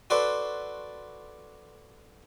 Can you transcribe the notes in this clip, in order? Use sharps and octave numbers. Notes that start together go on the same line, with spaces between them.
F#4 A4 B4 C5 D5